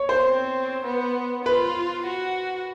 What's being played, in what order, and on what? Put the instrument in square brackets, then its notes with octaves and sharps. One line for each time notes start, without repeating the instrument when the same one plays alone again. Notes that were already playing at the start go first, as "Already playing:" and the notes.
Already playing: [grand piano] C#5
C5
[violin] C4
B3
[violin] F4 [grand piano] B4
[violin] F#4